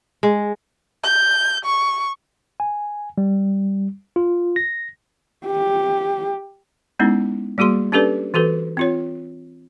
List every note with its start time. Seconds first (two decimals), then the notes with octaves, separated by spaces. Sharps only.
0.23 G#3
1.04 G6
1.65 C#6
2.60 G#5
3.18 G3
4.16 F4
4.56 A#6
5.46 G4
6.99 G#3 B3 C#4 D#4 E4
7.58 G3 A#3 F#4 G#4 C6
7.92 C#4 D4 G4 A4 B4 D5
8.34 E3 F#4 A4 B4
8.77 C4 F4 C#5